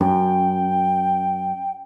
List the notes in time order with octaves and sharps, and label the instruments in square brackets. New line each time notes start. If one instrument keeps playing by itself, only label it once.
[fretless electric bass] F#2 [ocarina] G5